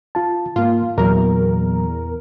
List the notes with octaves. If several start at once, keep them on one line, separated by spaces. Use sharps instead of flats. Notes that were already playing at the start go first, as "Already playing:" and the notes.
F4 A5
G#2 A#3 F4
E2 A#2 F#3 A#4